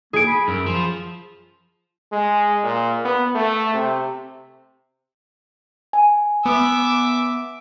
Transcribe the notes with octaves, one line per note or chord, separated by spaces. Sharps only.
A#3 G#4 D7
B5
F#2
F3
G#3
A#2
B3
A3
C3
G#5
B3 E5 D6